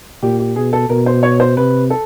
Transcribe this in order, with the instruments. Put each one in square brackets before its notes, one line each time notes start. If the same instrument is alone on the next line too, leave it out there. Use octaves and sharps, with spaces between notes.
[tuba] A#2 [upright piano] G4
[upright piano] G4
[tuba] B2 [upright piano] G#4
[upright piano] A4
[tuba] B2 [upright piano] A#4
[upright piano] C5
C#5
C5
[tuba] C3 [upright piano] B4
[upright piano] A4